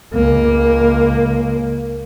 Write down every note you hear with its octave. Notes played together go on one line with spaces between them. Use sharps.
C#2 A#3